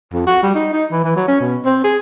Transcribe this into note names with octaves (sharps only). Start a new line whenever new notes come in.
F2
F#4
G3
D#4
D#4
E3
E3
F#3
C#4
B2
C4
G#4